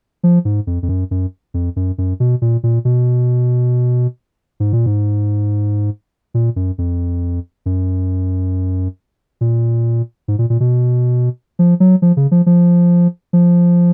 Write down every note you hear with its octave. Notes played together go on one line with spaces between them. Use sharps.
F3
G#2
F2
F2
F#2
F#2
F2
F#2
F#2
B2
A#2
A#2
B2
G#2
A#2
G#2
A#2
F#2
F2
F#2
A#2
G#2
A#2
A#2
B2
F3
F#3
F3
C#3
F3
F3
F3